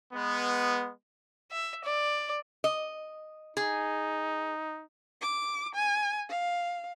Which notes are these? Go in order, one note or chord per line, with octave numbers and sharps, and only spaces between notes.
G#3 B3
E5
D5
D#5
D#4 G#4
D6
G#5
F5